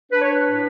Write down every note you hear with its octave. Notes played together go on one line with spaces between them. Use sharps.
D4 B4
C#5
B4
A2